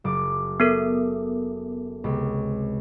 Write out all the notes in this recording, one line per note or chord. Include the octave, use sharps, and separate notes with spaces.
F#1 D6
B3 A4 A#4
C#2 C3